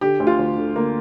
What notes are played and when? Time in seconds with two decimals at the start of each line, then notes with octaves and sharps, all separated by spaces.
0.01 D3 G4
0.20 D2
0.27 F4
0.39 D2
0.57 D3
0.76 D3 A#3